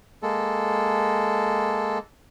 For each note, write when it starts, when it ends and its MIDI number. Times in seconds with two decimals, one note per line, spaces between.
0.23 1.99 56
0.23 1.99 58
0.23 1.99 69